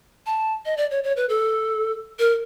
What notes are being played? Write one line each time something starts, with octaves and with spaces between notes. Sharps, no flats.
A5
D#5
D5
C#5
C#5
B4
A4
A#4